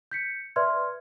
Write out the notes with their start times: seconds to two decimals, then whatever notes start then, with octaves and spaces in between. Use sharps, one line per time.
0.11 G6 B6 C#7
0.56 B4 D5 E5 C6 F6 G#6